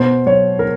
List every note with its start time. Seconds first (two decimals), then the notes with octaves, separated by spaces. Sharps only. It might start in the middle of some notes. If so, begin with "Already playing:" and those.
Already playing: B2 C5
0.26 F#3 C#5
0.59 A#4